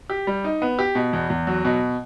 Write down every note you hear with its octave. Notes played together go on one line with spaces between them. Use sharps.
G4
G3
D#4
B3
G4
B2
E2
E2
F#3
B2